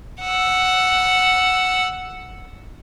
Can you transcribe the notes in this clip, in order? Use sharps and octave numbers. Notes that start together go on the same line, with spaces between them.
F#5 E6